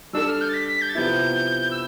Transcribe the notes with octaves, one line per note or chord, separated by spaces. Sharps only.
G3 D4 A4 E6
F6
G6
A6
B6
B6
G6
A6
C3 F3 B3 E4 G6
E6